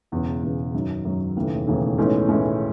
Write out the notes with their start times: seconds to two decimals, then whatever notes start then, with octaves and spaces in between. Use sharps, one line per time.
0.12 E1 E2 C#3
0.43 E1 E2 C#3
0.74 F#2 D#3 F#3
1.05 F#2 D#3 F#3
1.36 E1 D#2 C#3 E3 A3
1.67 E1 D#2 C#3 E3 A3
1.98 B1 A2 E3 G#3 C#4
2.28 B1 A2 E3 G#3 C#4